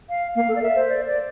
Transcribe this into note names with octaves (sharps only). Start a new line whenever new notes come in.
F5
A#3 F5
A4
D5
A#4 E5
C5
D5
D5